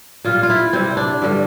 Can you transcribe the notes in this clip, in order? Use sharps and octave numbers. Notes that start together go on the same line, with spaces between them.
A#2 G3 F4
F4
E4
C3 G3 C4
D4
G2 D3 G3